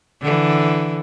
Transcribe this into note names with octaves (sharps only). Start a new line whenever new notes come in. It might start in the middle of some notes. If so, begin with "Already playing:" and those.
D3 E3